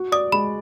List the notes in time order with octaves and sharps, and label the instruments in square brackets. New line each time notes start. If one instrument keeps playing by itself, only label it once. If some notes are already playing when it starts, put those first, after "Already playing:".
Already playing: [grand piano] F#4
[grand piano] D5 [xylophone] D#6
[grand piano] G#3 [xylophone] B5